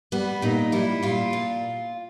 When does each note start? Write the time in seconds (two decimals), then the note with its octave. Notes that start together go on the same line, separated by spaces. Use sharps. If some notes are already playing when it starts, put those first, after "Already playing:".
0.12 G3 B3
0.42 A#2 D#4
0.72 G3 E4
1.03 A#2 F4
1.33 A#2